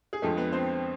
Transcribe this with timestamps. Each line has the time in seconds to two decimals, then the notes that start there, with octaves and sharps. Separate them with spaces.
0.13 G#4
0.22 F2 D3 F3 G#3 A3 A4
0.37 B3 B4
0.53 C4 C5